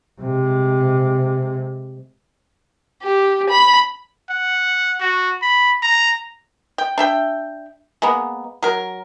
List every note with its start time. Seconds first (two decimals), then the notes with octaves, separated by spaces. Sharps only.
0.20 C3 G#3
3.02 G4
3.50 B5
4.30 F#5
5.01 F#4
5.42 B5
5.83 A#5
6.78 G5
6.98 D4 E5 G5
8.02 G#3 A#3 B3
8.62 F#3 A#4